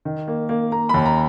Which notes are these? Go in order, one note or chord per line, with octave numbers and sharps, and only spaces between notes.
D#3
A#3
A#3
A#3 A#5
D#2 B5
A#5